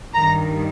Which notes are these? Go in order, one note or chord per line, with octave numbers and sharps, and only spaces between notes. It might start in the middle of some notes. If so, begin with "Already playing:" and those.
G2 D#3 A#5